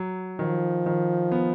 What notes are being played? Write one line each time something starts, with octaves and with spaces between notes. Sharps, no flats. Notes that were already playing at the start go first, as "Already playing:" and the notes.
Already playing: F#3
D#3 F3
D#3
B3